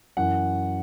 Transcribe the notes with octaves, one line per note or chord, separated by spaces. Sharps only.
F#2 E3 F#5